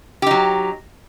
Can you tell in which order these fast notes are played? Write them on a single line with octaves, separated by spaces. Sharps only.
G4 D#4 F#3